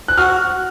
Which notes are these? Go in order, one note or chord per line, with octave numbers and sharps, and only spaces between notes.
F#6
F#4 F6